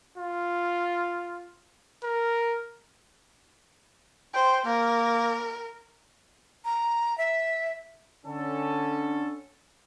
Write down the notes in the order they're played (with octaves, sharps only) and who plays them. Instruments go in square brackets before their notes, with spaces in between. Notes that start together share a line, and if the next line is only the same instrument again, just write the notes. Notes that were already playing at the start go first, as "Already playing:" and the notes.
[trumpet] F4
A#4
[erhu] C5 [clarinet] G5
[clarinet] A#3 [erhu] A#4
[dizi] A#5
E5
[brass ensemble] D3 C#4 A4